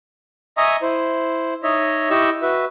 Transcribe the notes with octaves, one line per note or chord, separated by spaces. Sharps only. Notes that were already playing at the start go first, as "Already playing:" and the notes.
D#5 E5 G#5 A#5 C#6 D#6
E4 C5
D#4 C#5 D#5 E5
E4 G4 D#5 C#6 E6
F#4 B4 E5